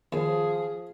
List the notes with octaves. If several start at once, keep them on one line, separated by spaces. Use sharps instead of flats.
D#2 F3 G#4